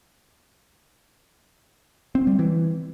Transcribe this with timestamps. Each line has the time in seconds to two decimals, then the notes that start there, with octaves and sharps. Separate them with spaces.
2.15 C4
2.27 G3
2.39 E3